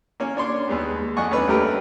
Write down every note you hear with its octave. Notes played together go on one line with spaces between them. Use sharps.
A#3 C#4
D4 C#5 C6 D6
D#2 G#3 B3
F2 D5 D#5 F#5 G#5 C#6
D#2 C#4 D4 B4
G3 A3 D4 G4 A#4 B4